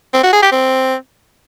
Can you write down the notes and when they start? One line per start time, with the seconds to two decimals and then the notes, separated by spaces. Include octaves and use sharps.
0.13 C4
0.23 F#4
0.33 G#4
0.42 G4
0.52 C4